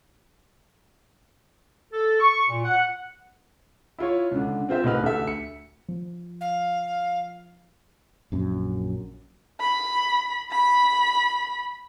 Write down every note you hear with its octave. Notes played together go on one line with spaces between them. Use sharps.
A4
C#6
A#2
F#5
E4 F4 C#5
C#2 D3
C4 F4 C5 E5
C2 A2 D#4 B4 F6
D2 A4 E5
C#7
F3
F5
A#1 F#2
B5
B5